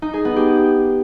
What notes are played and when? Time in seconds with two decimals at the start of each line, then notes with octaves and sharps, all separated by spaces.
0.02 D#4
0.14 G#4
0.25 B3
0.36 G4